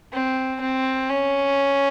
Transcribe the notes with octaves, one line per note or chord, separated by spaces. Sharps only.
C4
C4
C#4